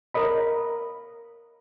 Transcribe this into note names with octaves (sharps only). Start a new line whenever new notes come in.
A#4 C#5 D#5 B5